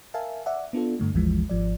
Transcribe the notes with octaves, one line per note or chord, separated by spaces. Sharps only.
A#4 E5 F5 G#5 A5
D5 E5 F#5
B3 D4 F4 A4
G2 D3 A3
G#1 D#2 E3 F3 G#3
G#1 F3 D5